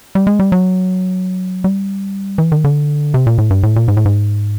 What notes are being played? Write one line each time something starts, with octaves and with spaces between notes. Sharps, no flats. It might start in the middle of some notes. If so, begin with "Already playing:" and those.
G3
G#3
G3
F#3
G3
E3
D#3
D3
C3
A#2
A2
G2
A2
A#2
G#2
A2
G#2